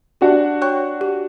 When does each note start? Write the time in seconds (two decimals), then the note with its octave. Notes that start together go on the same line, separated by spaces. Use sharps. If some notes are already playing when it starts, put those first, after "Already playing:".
0.21 D4 F#4 G4
0.62 C#5 G5 C#6 F#6
1.01 G4